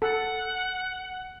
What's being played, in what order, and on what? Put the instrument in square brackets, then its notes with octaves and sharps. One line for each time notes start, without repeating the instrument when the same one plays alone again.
[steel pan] A4 [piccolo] F#5